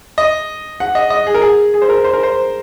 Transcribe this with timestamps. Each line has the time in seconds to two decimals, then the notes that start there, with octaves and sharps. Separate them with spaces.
0.18 D#5
0.80 F#5
0.95 D#5
1.10 D#5
1.27 G#4
1.34 A#4
1.42 G#4
1.74 G#4
1.82 C5
1.89 A#4
2.04 C5
2.13 A#4
2.23 C5